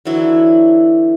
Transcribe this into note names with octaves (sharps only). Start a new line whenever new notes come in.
D3 E3 F#3 E4